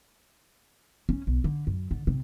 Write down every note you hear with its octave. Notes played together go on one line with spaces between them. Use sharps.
C#4
B1
D3
F#2
D3
C3